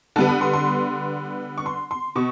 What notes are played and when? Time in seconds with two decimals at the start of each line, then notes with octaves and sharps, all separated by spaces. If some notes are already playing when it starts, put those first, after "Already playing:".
0.16 D3 G3 B3 A5
0.28 B5
0.41 C6
0.53 C6
1.58 C#6
1.66 C6
1.91 C6
2.16 B2 C#6